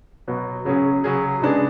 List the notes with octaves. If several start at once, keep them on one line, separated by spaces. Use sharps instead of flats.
B2 F#3 B3
C#3 F#3 C#4 G#4
C#3 F#3 C#4 G#4
C#3 G#3 B3 D4 G#4